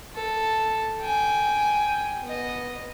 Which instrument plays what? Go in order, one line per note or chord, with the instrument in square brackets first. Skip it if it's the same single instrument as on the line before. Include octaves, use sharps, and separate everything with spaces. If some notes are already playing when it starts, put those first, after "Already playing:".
[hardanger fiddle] A4
G5 G#5
B3 D#5